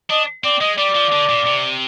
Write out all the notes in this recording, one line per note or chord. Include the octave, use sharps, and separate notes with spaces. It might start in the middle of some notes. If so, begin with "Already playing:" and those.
D4 D#5
C4 D5
G#3 D#5
G3 D5
F3
D3
A#2
C3